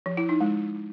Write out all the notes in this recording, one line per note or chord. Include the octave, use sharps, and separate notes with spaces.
F3
E4
D#4
G#3